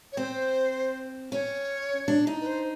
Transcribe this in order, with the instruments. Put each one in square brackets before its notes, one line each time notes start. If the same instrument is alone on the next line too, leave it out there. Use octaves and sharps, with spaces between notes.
[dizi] C#5
[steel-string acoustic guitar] C4 [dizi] C5
[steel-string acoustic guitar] C#4 [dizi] C#5
[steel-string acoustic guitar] D4
D#4
[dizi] B4
C5